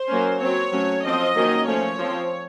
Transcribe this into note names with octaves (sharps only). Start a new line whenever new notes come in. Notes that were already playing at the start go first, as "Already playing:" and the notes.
Already playing: C5
F#3 A#3 C#4
F#3 C4 C#5
F#3 A3 C#4
F3 C4 D#5
D#3 F#3 A#3 C#4
F3 A3 C#4 C#5
F3 C4